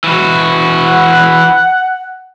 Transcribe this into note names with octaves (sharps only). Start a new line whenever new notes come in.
E3 F#4
F#5